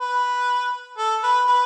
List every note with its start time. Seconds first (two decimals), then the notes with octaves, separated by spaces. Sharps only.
0.01 B4
0.98 A4
1.23 B4
1.47 B4